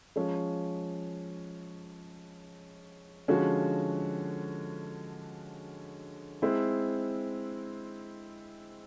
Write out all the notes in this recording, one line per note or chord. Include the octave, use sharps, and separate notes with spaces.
F3 G#3 C#4
D3 F3 G#3 C#4 F#4
G#3 C4 E4